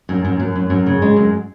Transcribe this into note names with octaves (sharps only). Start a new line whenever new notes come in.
F#2
F#2
F#2
F#2
F#2
C#3
G#3
F#2